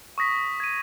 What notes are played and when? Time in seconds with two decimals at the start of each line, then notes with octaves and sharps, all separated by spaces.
0.18 C#6 D#6 A#6 B6
0.60 G#6 D#7